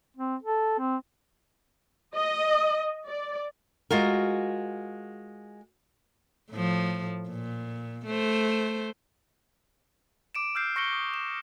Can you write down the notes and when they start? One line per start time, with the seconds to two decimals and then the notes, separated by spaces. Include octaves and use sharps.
0.17 C4
0.43 A4
0.79 C4
2.14 D#5
3.06 D5
3.91 G#3 F4 F#4 A#4
6.51 A2 F3
7.29 A#2
8.06 A3 C5
10.35 D6 D7 E7
10.55 E6 F6 G6 C7
10.76 C#6 A#6 C#7 D7 G7
10.93 D#6
11.14 E7